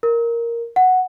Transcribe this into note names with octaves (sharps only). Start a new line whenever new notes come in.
A#4
F#5